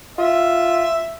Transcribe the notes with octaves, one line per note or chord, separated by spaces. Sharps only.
F4 E5